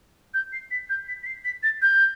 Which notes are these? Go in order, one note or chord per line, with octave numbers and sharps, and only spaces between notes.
G6
C7
B6
G6
B6
B6
C7
B6
A6
G6